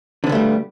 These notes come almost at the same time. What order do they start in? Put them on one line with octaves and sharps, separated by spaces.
D3 B3 A#2 A3 G3